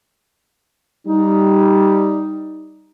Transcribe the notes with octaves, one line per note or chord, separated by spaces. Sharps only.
G3 D#4